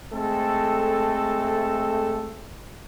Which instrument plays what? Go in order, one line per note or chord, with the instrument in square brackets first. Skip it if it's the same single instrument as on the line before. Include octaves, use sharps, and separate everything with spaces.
[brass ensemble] G#3 A3 C4 A4